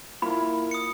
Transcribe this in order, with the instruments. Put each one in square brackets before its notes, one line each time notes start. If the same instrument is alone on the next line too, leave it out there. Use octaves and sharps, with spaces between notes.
[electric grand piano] A#3 E4 A#4 [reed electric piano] F4 [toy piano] B5
[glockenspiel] D#6 C#7